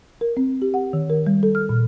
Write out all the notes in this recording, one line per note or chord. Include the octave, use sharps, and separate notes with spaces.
A#4
C4
G4
F#5
D#3
A#4
G3
A4
F6
A#2